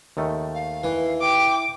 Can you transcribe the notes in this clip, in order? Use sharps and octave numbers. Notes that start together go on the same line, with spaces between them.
D#2 D#3 A3
F5
E3
G5 D6